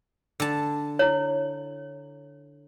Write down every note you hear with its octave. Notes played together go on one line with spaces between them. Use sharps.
D3 A5
E4 C#5